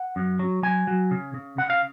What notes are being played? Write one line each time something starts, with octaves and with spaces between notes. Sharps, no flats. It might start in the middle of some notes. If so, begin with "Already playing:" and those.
Already playing: F#5
F#2
F#3
F#3 G#5
F#3
C#3
C#3
C#3 F#5
F5